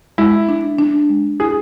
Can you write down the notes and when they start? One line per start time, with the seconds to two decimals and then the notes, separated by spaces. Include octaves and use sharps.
0.18 G#3 E4
0.49 D4
0.79 D4
1.09 G#3
1.40 E4 G#4